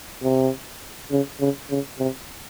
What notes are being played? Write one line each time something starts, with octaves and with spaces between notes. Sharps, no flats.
C3
C#3
C#3
C#3
C3